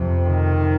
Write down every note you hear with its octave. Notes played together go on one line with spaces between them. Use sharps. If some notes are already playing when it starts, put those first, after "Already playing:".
Already playing: F2 C3
D#3